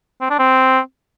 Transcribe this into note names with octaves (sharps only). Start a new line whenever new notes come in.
C4
D4
C4